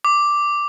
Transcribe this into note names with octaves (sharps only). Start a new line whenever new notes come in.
D6